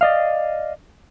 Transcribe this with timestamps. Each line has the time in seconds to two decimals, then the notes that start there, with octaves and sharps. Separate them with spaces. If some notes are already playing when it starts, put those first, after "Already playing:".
0.01 D5 D#5 F5